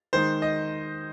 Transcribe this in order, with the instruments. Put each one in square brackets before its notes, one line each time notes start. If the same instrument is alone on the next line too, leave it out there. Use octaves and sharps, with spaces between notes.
[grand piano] D#3 G#3 D#4 C5
D#5